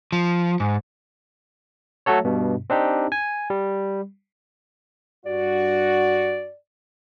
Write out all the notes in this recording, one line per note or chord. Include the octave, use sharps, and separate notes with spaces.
F3
G#2
F#3 A3 F#4 A4 C#5
G2 B2
C4 D4 D#4 G4
G#5
G3
G2 F#4 D5